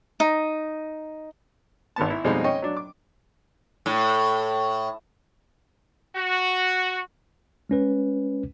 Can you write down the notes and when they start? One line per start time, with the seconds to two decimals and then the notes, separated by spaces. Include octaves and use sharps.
0.20 D#4
1.96 G#1 D#3 B3 A5
2.10 E4
2.24 F2 B2 G3 G#3 C4 D#4
2.44 C#4 D#5 G5 C#6
2.62 F#3 D4
2.77 D6
3.86 A2
6.14 F#4
7.69 G#3 C#4 B4